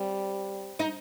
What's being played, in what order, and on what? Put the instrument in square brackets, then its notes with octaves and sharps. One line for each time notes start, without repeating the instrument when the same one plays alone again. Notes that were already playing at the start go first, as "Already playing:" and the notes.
Already playing: [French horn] G3 [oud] C4
[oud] D#4